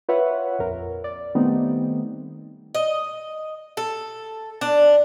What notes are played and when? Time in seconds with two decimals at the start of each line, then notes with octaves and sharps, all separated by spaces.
0.09 F4 B4 C#5 E5 F#5
0.59 A#1 F2 A#4
1.04 D5
1.35 D#3 G3 A3 B3 C4 D#4
2.75 D#5
3.77 A4
4.61 D4